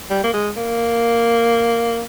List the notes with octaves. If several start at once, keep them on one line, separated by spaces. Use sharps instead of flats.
G3
A#3
G#3
A#3